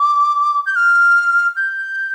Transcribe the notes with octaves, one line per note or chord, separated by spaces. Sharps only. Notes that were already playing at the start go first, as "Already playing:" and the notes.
Already playing: D6
G6
F6
G6